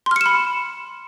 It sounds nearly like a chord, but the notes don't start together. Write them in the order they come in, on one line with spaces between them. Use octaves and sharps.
C6 F6 C#7 E7 B5